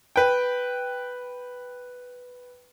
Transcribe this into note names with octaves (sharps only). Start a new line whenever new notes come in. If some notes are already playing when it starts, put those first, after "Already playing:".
B4 G5